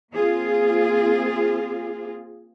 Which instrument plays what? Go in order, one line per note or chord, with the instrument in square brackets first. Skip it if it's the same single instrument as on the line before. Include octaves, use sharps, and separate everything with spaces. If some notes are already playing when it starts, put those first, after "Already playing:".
[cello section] A#3 C4 F4 G#4